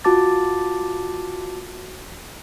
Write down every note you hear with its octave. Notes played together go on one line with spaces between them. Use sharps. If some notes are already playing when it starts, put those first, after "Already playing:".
F4 F#4 A5 D6 A6